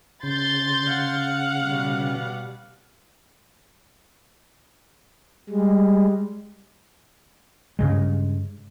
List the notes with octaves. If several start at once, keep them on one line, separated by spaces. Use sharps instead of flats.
C#3 C6 G6 A6
F5 F#5
B2 G3
G3 G#3
G2 C#3 G#3